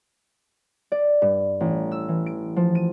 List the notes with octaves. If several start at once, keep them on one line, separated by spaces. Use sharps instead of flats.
D5
G2
A1
E6
E3
D7
F3
D#7